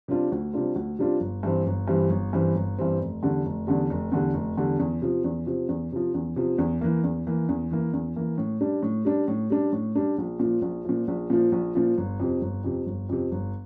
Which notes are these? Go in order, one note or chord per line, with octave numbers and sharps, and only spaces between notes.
C3 G3 D4 F4
D2
C3 G3 D4 F4
D2
C3 G3 D4 F4
G1
G2 E3 G3 C4
G1
G2 E3 G3 C4
G1
G2 E3 G3 C4
G1
G2 E3 G3 C4
F1
E2 D3 G3
F1
E2 D3 G3
F1
E2 D3 G3
F1
E2 D3 G3
E2
C3 F3
E2
C3 F3
E2
C3 F3
E2
C3 F3
E2
E3 A#3
E2
E3 A#3
E2
E3 A#3
E2
E3 A#3
A2
G3 D4
A2
G3 D4
A2
G3 D4
A2
G3 D4
A#1
A#2 F3
A#1
A#2 F3
A#1
A#2 F3
A#1
A#2 F3
G1
F2 C3
G1
F2 C3
G1
F2 C3
G1